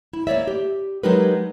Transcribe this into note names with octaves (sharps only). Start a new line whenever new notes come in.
E4
A#3 C#5 D5 E5
G4
F#3 G#3 D#4 G4 A#4 B4